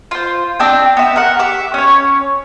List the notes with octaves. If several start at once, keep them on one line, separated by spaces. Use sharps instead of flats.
F4 C5
C4 D4 G5
B3 E5
A#4 F#5
G4 E5
C#4 C#5